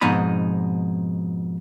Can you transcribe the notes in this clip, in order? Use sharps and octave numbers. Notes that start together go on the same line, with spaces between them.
F2 G#2 B2 D#4 B5